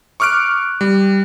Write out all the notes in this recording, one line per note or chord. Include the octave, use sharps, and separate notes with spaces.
C#6 D6 F6 F#6 D7
G3